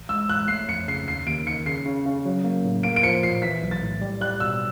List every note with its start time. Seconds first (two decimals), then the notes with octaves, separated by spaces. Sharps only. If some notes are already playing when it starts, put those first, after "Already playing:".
Already playing: A1
0.09 G#3 E6
0.29 A1 F#6
0.48 A3 C7
0.69 F2 C#7
0.88 C#3 C7
1.07 D#2 C7
1.27 D#2 D7
1.46 D#3 C#7
1.66 C#3 C7
1.86 C#3
2.05 C#3
2.26 F#3
2.44 A#3
2.65 A2
2.83 A#3 D7
2.96 D7
3.03 F3 C#7
3.23 A#2 C7
3.42 E3 B6
3.62 B1
3.71 A6
3.82 A2
4.01 G3
4.21 G3 F#6
4.40 B2 E6